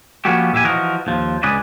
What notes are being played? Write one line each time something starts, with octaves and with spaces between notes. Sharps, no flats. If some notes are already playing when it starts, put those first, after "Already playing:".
F3 A#3 B3 C#4 F#4 G4
A#2 E4 G4 E5 G#5
E3 F3 F#4 A#4 D#5
D#2 F3
C#2 G#4 B4 D5 D#5